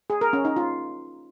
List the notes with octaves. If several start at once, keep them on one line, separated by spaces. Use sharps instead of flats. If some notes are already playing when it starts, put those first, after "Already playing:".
G#4
A#4
C#4
D#4
F4